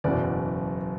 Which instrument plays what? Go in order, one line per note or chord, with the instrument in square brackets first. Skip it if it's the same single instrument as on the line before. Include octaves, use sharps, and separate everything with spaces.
[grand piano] F#1 E2 B2 D5